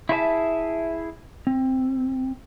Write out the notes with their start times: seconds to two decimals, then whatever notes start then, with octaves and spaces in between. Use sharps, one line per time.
0.09 E4 F4 G#4 C5 E5 A5
1.47 C4